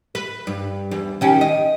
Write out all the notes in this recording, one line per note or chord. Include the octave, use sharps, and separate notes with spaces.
B4
G2
E2
D#3 C#4 G4
D#5